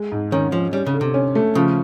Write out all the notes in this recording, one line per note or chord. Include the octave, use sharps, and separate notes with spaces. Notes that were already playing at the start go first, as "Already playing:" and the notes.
Already playing: G#3
G#2
D#3 C#4
F3 C#4
G3 C#4
C#3
D3
C3
C#4
A3
C#3 F3